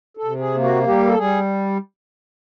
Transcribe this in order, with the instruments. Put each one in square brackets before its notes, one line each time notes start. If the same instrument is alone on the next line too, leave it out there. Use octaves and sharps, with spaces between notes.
[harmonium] A4
C3
G#4
A#3
F#4
G3 G4
A4
G3 G#4